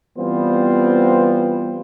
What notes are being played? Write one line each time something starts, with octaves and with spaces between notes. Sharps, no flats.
E3 G3 B3 C4 F4 C5